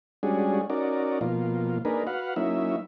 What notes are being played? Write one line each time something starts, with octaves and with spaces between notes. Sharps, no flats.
G3 G#3 C#4 D4 F#4 G#4
C#4 D#4 F#4 A#4 D5
B2 F3 A#3 F4
A#3 D4 D#4 G#4 A#4 B4
F#4 B4 F5 F#5
F#3 A#3 C#4 D#4 E4 E5